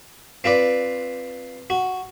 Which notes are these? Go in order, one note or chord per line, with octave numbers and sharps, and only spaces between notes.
C4 F4 B4 D5
F#4